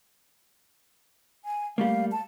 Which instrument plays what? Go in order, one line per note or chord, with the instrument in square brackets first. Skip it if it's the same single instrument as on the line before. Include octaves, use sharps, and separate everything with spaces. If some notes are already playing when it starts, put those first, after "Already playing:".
[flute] G#5
[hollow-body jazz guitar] G3 A3 A#3 [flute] F5
[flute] A5